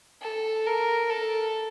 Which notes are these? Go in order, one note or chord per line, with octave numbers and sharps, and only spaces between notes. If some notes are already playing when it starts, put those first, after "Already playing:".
A4
A#4
A4